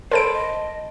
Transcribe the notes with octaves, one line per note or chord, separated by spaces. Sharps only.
A4 A#4 C5 A5 B5 C6 D7
D#5